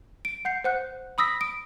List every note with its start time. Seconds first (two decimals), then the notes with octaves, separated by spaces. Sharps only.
0.25 D7
0.45 F#5 G6 C7
0.64 C5 F#5 F#6
1.18 B5 D#6 E6 A#6 B6
1.41 D#6 D7